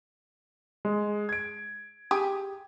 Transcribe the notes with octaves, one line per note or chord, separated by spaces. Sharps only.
G#3
G#6 D7
G4 G#4